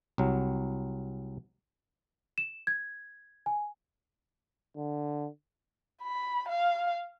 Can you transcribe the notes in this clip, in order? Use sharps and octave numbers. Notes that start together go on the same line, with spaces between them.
C2 F#3
E7
G#6
G#5
D3
B5
F5